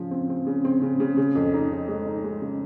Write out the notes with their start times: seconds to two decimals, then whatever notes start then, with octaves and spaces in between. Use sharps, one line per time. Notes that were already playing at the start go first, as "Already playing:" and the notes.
Already playing: C#3 F3
0.11 C4
0.29 C4
0.46 C#3
0.65 C4
0.82 C#3
1.00 C#3
1.17 C#3
1.35 F2
1.53 D#4
1.71 C#3
1.88 G#3
2.07 D#4
2.24 G#3
2.42 C#3